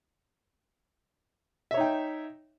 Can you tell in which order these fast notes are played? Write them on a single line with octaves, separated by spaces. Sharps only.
E5 C#5 D#4 G5